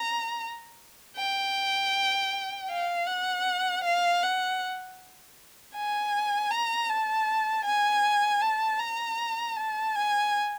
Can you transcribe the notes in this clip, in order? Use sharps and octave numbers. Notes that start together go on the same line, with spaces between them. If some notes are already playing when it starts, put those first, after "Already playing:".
Already playing: A#5
G5
F5
F#5
F5
F#5
G#5
A#5
A5
G#5
A5
A#5
A5
G#5